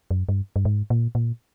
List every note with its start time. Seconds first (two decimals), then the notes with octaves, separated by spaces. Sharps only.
0.11 F#2
0.29 G2
0.56 G2
0.65 G#2
0.90 A#2
1.15 A#2